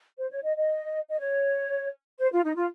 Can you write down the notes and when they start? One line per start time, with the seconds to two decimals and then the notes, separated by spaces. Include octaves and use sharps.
0.18 C5
0.31 C#5
0.43 D#5
0.57 D#5
1.10 D#5
1.19 C#5
2.18 C5
2.32 F4
2.44 D#4
2.56 F4